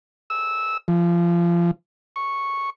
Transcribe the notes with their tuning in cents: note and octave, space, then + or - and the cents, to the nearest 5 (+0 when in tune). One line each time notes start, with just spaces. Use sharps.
E6 -10
F3 -25
C#6 -5